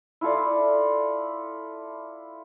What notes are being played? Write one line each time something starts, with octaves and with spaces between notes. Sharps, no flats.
E4 F4 A4 D5